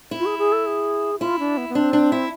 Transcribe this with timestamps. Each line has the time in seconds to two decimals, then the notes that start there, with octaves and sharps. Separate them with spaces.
0.11 E4
0.20 F4
0.26 G#4
0.39 G#4
0.53 A4
0.66 G#4
1.20 E4 F4
1.39 D4
1.57 B3
1.69 B3
1.75 C4 D4
1.93 D4
2.12 E4